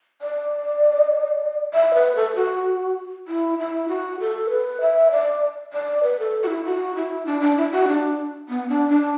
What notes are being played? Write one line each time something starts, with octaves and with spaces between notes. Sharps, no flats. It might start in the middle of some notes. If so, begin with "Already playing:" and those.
D5
E5
B4
A4
F#4
E4
E4
F#4
A4
B4
E5
D5
D5
B4
A4
F#4
E4
F#4
E4
D4
D4
E4
F#4
D4
B3
D4
D4